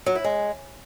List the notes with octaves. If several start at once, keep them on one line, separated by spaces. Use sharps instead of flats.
F#3
E4
G#3